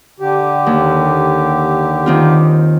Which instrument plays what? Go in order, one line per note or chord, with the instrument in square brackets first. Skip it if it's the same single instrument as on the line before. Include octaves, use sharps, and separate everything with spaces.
[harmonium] D3 G4
[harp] D#2
D#3 C4 F4